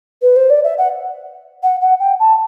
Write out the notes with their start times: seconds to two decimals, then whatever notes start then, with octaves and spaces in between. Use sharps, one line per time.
0.22 B4
0.36 C5
0.50 D5
0.64 E5
0.78 F#5
1.63 F#5
1.81 F#5
2.00 G5
2.19 A5